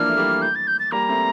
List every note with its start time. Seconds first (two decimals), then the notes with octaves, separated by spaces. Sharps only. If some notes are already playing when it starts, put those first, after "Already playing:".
Already playing: E3 F3 A#3 D4 F6
0.09 A3
0.17 G3 A#3
0.42 G6
0.55 A6
0.67 G6
0.79 A6
0.92 G3 A#3 A#5
1.09 A3 C4